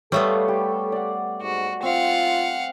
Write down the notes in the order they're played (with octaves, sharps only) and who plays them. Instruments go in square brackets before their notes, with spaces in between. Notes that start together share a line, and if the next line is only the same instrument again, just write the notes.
[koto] G3 A3 B3 [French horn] A4 [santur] C#5 F5 C6
[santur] G4
D5 F#5
[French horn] G#2 [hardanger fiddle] F#4
[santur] C4 [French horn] F4 [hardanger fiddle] F5 F#5